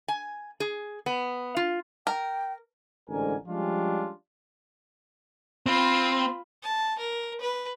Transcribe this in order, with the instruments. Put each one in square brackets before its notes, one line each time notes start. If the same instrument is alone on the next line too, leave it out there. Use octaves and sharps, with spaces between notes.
[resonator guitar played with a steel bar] G#5
G#4
B3
F4
[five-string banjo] A#4 [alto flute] G5
[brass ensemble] A1 G#2 D3 D4 A#4 G#5
F3 G3 G#3 C#4 D4 F4
[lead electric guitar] C4 [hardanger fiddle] F4 B5
[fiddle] A5
A#4
B4